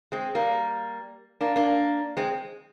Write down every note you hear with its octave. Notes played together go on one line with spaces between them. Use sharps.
G#3 C4
G3 A#3
A#3 D4
A#3 D4
G#3 C4